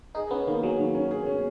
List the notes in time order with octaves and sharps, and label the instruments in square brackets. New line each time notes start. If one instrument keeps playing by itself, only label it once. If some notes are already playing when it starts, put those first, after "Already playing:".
[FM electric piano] D#4 [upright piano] G#4
[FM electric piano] B3 [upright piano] C#4
[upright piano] D#3 [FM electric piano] A#3
[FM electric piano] F#3 [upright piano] G#4
[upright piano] D#3
C#4
G#4
C#4